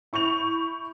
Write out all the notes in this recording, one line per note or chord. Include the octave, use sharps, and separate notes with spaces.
E4 C#6 G6 F7